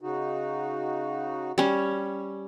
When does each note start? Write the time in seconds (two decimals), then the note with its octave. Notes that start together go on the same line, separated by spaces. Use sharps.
0.01 C#3 D#4 F#4
1.58 G3 C#4